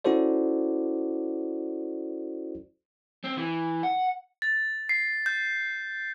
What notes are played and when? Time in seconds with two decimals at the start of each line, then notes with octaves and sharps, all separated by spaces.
0.04 C#4 E4 F#4 A4 C5 D5
3.24 C4
3.37 E3
3.83 F#5
4.42 A6
4.89 C7
5.26 G6